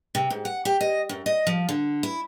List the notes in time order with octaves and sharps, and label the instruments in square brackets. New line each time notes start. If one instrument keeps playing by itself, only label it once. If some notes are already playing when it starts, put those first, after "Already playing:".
[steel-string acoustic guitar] C3
G#2
F#5
G4
D#5
F#2
D#5
F3
D3
E4